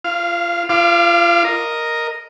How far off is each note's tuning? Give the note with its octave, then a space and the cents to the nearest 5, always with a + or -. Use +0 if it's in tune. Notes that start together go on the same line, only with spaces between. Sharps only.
F4 -30 F5 +0
F4 -35 F5 +0 D6 +20
A#4 +0 D#5 +0